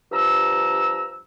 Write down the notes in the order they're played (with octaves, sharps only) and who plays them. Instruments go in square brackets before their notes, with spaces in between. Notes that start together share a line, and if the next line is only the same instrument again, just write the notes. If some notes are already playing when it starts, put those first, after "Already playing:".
[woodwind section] G2 F3 A#5 E6